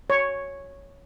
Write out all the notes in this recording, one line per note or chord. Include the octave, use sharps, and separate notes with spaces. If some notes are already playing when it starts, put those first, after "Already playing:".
C#5